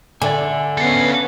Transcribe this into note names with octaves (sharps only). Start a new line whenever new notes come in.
D3 D5 E5 G#5
B3 C#4 A4 F5